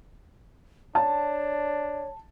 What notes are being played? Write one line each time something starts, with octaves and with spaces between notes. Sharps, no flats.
D4 C#5 A5